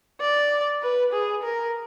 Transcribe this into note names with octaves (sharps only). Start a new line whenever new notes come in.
D5
B4
G#4
A#4